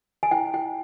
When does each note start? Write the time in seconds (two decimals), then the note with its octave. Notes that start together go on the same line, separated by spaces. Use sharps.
0.23 G#5
0.31 E4 G5
0.54 E4 G5